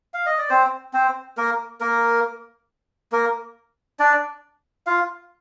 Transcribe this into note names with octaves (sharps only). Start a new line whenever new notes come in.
F5
D#5
D5
C4 C5
C4 C5
A#3 A#4
A#3 A#4
A#3 A#4
D4 D5
F4 F5